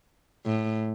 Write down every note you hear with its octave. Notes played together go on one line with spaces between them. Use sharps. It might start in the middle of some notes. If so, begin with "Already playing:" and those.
A2